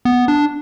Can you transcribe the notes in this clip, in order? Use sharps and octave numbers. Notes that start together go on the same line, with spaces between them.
B3
D4